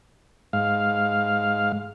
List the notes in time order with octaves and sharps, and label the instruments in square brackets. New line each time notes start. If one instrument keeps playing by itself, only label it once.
[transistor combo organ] G#2 F5